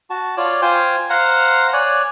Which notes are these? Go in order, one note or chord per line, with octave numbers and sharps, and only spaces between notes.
F#4 A5
F4 C#5 D5
F4 C5 G5 G#5
C5 F5 F#5 A#5
C#5 D5 G#5 F#6